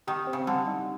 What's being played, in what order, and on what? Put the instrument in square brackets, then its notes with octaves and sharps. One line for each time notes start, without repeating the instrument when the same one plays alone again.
[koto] D#3 [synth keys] G4
[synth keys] C4
[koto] C#3
[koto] D3 [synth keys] G3
[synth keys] D#4